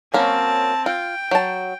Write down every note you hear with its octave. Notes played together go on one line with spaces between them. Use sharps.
F#3 A#3 C4 C#4 A5
F4 G5
F#3 A5